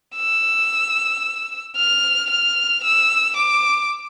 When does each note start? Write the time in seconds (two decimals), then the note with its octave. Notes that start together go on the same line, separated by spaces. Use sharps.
0.16 E6
1.77 F6
2.30 F6
2.84 E6
3.37 D6